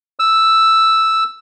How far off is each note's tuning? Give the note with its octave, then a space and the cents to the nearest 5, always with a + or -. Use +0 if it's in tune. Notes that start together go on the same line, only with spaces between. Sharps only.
E6 +0